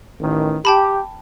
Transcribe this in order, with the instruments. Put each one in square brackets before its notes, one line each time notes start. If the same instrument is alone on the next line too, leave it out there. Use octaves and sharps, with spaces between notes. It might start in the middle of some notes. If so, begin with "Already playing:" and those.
[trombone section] A1 D#3
[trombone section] G4 [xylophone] G5 A5 B5